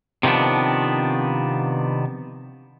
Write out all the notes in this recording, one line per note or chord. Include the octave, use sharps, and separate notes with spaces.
C3 D#3 F3 B3 D4